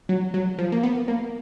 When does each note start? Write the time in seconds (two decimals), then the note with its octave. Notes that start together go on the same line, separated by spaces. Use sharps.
0.09 F#3
0.34 F#3
0.59 F3
0.72 A#3
0.83 B3
1.08 A#3